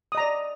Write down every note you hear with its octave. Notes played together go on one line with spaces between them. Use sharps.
D5 D#5 A#5 D#6